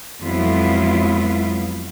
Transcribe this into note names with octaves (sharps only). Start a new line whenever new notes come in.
F2 F#3 G#3 B3 E4 F4